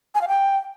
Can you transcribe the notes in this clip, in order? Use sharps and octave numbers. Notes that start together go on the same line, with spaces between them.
G#5
F5
G5